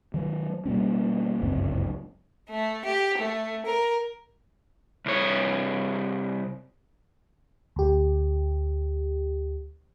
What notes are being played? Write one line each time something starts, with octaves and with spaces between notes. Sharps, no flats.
D#3 F#3
B2 G3 A#3 C#4
G1 C#2 F#2 C4
A3
G4
A3
A#4
C2 C#5
D2 G4